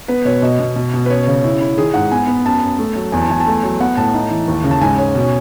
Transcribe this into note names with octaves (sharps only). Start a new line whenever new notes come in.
B3 B4
B2 C#5
B2 D#5
B2
B2
B2
B4
C#4 C#5
C#3
E4
E4
D#3 G#4
G#2 F#5
B3 G#5
B3
F#2 A5
F#2
A3
F#3
E2 G#5
A5
E2 G#5
A5
A3 G#5
F#3
B3 F#5
A2 A5
D#4
E3
D#2
C#3
A5
G#2 G#5
C#4
B2